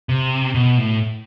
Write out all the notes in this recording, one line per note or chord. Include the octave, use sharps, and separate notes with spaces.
C3
B2
A2